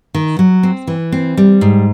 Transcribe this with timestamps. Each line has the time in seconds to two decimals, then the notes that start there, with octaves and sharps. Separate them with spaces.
0.14 D#3
0.39 F#3
0.63 C4
0.87 E3
1.12 C4
1.37 G3
1.61 G#2